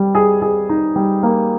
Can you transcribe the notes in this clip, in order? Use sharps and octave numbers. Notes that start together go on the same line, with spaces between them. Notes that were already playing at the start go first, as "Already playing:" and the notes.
Already playing: G3
G#4
G#4
D#4
G3
A#3